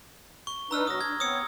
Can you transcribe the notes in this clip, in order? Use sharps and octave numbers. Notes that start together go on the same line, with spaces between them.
C#6 G7
D4 D#4 B4 A#5 E6 F6
B2 F#3 F#4 D#6 A#6
D4 G#6
B3 C4 C#5 D#6 E6 C#7